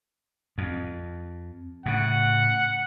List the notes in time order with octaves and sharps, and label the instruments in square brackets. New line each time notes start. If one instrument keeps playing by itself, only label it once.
[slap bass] F2
[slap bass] A2 C#3 [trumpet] F#5